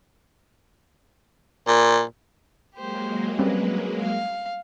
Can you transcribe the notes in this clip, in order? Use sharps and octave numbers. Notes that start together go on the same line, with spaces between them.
A#2
F#3 G#3 A#3 G4 C5
G3 C4 C#4 B4
F5